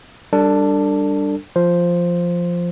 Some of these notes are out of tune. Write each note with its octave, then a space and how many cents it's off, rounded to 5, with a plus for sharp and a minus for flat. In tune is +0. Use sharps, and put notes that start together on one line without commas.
G3 +0 D4 +0 A4 +35
F3 +0 C5 +0